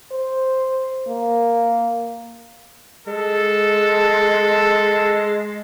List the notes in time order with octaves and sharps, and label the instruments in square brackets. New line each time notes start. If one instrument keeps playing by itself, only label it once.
[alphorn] C5
A#3
[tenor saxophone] G#3 [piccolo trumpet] A4